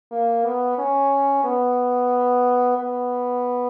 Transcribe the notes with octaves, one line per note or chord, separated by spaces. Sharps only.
A#3
B3
C#4
B3
B3